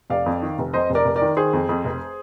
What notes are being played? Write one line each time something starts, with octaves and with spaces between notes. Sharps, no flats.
F1 D5 F5
F2
D#3
F1
F2 C5 D#5
F1
A#4 D5
F1
A#4 D5
D#3
D#3 G#4 C5
F2
F2
F1